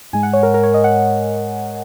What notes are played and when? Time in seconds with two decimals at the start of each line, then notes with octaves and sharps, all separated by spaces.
0.13 G#2 G#3 G#5
0.23 F#5
0.33 C#5
0.43 A#4
0.54 A#4
0.63 C#5
0.74 D#5
0.84 F#5